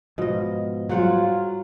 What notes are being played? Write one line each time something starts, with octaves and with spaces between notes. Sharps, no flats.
G#2 B2 F3 G#3 D#5
G2 F#3 F4 G#4 C5 F#5